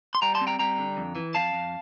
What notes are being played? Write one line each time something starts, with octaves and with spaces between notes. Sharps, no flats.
C6
G3 G5 A#5
A5 C6
C4
G5 A#5
G3 G5 A#5
D3
F2
E3
F2 F5 A5
F2